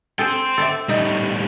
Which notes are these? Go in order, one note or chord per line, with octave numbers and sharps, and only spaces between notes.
G#4 A4 C5 G5
A4 D5 E5
A2 G3 D#4